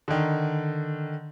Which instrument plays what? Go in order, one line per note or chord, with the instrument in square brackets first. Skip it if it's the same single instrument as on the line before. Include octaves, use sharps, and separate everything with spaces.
[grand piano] D3 D#3